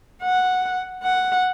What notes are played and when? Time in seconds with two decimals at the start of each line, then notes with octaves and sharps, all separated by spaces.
0.22 F#5
1.03 F#5